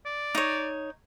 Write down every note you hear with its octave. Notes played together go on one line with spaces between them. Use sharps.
D5
D#4 C#5